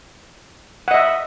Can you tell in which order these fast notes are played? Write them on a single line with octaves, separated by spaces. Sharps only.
F#5 D#5 E5